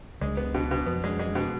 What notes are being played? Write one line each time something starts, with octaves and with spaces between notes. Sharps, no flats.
C#2 C#3 G#3
B3
B2
B2
F2 F3 B3
G#3
G#3
B2